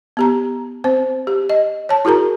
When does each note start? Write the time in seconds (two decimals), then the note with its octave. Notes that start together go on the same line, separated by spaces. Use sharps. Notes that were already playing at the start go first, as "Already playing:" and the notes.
0.17 B3 G4 A#5
0.84 C4 C5
1.27 G4
1.50 D#5
1.89 C#5 A5
2.05 E4 F#4 G#4 A#4 A#5